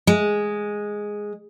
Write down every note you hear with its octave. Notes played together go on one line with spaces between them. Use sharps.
G#3